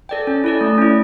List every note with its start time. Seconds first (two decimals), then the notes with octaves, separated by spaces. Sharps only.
0.09 A4 D5 G5
0.27 C#4
0.44 E4 A4 D5
0.61 A3
0.78 C#4 E4